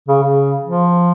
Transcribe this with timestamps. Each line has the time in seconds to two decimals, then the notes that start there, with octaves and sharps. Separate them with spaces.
0.08 C#3
0.22 C#3
0.64 F3